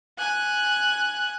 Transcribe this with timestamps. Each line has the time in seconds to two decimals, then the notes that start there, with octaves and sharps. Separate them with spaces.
0.18 G#5 F#6